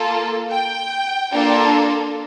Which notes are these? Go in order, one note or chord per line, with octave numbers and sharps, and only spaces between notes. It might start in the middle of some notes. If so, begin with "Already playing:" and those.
Already playing: A#3 F4 A4
G5
A#3 D4 F4 A4